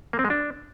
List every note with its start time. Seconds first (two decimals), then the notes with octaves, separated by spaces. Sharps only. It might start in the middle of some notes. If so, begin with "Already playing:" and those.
0.13 A#3
0.19 C4
0.25 G#3
0.30 D4